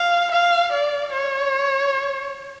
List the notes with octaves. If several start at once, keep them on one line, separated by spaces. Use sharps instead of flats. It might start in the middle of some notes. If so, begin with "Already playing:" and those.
Already playing: F5
F5
D5
C#5